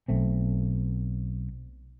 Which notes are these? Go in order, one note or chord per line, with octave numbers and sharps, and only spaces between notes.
B1 A3 C4